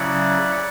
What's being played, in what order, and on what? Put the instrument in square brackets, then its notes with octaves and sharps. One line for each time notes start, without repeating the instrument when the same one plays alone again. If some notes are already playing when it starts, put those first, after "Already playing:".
Already playing: [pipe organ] C#3 F#3 C#4 E4 D5 F#5